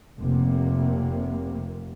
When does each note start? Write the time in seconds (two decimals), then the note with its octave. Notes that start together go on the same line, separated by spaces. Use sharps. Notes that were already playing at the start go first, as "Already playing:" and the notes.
0.18 F1 C3 A#3